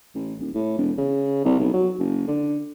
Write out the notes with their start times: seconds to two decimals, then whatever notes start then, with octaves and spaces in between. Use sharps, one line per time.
0.15 A1
0.40 D#1
0.54 A2
0.78 E1
0.98 C#3
1.45 C2
1.60 B1
1.74 F#3
1.99 F#1
2.28 D3